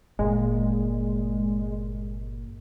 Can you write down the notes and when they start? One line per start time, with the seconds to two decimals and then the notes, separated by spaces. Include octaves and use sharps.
0.19 G1 A#2 G#3 A#3